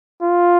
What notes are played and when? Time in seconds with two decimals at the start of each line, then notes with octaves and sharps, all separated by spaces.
0.22 F4